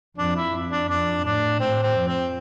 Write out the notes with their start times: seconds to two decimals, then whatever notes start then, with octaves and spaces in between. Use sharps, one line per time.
0.18 F2 D4
0.36 E4
0.53 F2
0.71 D4
0.89 F2 D4
1.24 A2 D4
1.60 A2 C4
1.83 C4
1.95 F2
2.08 C4